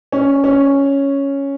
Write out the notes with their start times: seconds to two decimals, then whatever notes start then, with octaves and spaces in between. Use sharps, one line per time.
0.12 C#4
0.44 C#4